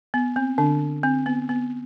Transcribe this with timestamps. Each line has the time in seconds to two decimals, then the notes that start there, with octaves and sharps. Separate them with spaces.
0.14 B3
0.36 C4
0.58 D3 D4
1.03 C4
1.26 B3
1.49 B3